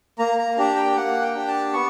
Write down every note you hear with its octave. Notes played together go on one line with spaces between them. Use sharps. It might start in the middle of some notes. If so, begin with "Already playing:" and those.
A#3 A#5
A#5
D4 G4 A#5
G5
A#3 F#5
G5
D4 G4
A5
B3 C#6